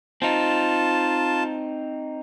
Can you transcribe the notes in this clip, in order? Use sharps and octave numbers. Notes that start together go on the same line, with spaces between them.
C4 D#4 F4 A5